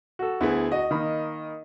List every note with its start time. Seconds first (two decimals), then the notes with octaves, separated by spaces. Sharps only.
0.19 F#4 A4
0.41 D2 B3 E4 G#4
0.72 F#4 D#5
0.91 D#3 A#3 B5